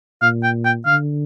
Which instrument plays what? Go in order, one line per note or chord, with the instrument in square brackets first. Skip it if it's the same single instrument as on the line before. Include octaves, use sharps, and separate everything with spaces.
[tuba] A#2 [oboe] F5
[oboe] G5
G5
[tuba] D3 [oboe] F5